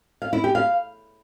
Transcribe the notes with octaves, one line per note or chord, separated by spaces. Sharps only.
F5
E4
G4
F5